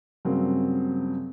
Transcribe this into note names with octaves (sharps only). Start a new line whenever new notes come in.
G2 C#3 F#3 A#3 C4